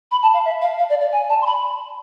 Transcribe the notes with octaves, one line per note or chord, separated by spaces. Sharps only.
B5
A5
F5
E5
F5
F5
D5
D5
G#5
A5
C6
B5